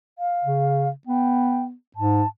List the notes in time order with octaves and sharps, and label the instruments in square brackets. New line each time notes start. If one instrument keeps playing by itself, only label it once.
[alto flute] F5
[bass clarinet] C#3
[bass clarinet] B3 [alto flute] G5
[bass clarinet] G#2 [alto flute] A5